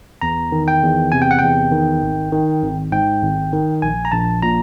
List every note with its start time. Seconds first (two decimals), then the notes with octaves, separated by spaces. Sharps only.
0.21 E2 A#5
0.52 D#3
0.68 G5
0.83 E2
1.12 C3 G#5
1.22 G5
1.31 F#5
1.39 E2 G5
1.72 D#3
2.03 G#1
2.32 D#3
2.63 G#1
2.92 G#2 G5
3.22 G#1
3.53 D#3
3.82 A#1 G#5
4.05 A#5
4.12 A#1 A5
4.42 A#2 A#5